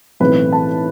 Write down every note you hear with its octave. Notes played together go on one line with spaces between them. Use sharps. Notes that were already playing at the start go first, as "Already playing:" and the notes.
B1 A2 E3 A3 C4 B4
A5